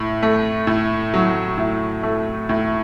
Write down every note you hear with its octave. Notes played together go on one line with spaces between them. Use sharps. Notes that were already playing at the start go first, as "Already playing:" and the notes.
Already playing: A2
A3
A2
F#3
A2
A3
A2